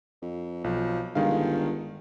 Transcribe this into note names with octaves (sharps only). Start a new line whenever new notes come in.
F2
B1 F3
G1 D#3 G#3 F5